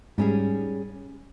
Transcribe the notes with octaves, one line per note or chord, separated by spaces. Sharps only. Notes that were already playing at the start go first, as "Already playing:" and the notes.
G#2 G3 C#4 G#4